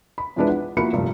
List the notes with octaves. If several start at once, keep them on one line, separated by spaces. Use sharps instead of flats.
B5
F2 E3 G#3 D4 E4 B4
F#5
F3 A#3 E4 F#4 B5 C#7
F1 G2 A#2 F3